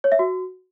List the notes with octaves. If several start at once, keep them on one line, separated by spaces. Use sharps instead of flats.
C#5
E5
F#4